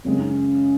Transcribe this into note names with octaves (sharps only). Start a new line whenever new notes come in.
F#2 C#3 G#3 C4
D#4
C#4